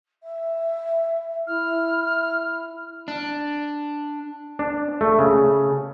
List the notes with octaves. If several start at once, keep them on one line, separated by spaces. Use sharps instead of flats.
E5
E4 F6
D4
D4
A3
C#3